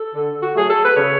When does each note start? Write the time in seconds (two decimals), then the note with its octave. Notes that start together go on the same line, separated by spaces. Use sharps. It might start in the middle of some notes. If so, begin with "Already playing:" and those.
Already playing: A4
0.13 D3
0.42 F#4
0.55 F#3 A3 G#4
0.69 A4
0.84 B4
0.96 C#3 C#5